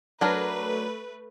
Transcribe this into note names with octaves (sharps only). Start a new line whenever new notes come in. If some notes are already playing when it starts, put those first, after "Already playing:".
F#3 A3 D4 A#4 B4